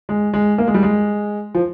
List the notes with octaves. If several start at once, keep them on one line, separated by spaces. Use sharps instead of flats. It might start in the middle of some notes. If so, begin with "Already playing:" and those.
G#3
G#3
A#3
G#3
G3
G#3
F3